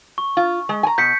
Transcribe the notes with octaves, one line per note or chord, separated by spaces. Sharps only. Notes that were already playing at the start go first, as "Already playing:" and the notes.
C#6
F4
G#3
G#5 A#5
B2 G6 B6 C#7